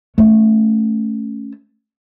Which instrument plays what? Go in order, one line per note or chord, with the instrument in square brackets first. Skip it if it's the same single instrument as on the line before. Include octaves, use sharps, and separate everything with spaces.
[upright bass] A3 C#4